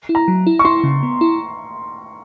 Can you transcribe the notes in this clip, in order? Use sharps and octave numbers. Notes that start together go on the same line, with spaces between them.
E4
A#5
F#3
E4
C#6
E4 C6
C#3
B3
E4